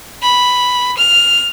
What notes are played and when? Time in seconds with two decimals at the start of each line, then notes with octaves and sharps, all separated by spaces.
0.22 B5
0.97 F6